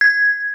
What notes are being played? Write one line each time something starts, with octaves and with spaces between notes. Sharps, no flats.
G#6